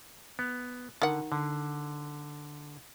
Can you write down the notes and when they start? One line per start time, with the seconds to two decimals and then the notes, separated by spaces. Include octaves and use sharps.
0.39 B3
1.02 D3 D#3 F#5
1.32 D3